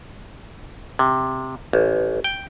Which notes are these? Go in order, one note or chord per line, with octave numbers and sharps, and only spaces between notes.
C3
A1
G5